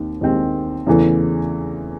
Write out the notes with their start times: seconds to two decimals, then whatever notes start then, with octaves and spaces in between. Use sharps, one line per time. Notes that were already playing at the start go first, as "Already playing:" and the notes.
Already playing: D#2 D#3 C4
0.21 D#2 D#3 G#3 C4
0.87 E2 C#3 E3 A3